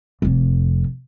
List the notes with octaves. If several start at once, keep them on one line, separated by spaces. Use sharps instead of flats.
F1 F2